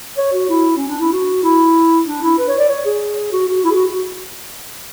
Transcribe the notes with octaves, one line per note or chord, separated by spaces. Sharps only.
C#5
F#4
E4
C#4
D4
E4
F#4
E4
D4
E4
B4
C#5
D5
C#5
G#4
F#4
F#4
E4
G#4
F#4